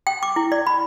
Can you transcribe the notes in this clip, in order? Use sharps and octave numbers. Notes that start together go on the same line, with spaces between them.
G5
D6
E4
D5
B5